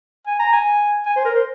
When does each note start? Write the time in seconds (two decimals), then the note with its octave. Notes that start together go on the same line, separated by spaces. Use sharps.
0.27 G#5
0.40 A#5
0.53 G#5
1.06 G#5
1.16 C5
1.25 A#4
1.35 C5